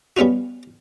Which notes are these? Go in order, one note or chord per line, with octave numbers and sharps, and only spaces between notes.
G3 B3 C#4 F4 F#4